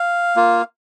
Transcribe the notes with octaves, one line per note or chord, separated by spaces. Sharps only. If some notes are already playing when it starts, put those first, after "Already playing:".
Already playing: F5
A#3 F4